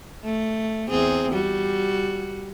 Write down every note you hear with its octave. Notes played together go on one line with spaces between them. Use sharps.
A3
E2 C4 G#4
G3 F#4